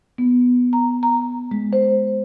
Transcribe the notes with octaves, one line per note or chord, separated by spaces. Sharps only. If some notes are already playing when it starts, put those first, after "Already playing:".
B3
A#5
A#5
G#3
C5